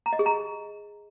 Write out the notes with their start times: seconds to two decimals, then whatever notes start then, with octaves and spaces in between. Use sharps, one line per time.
0.06 A#5
0.13 D#5
0.19 G#4
0.26 A#5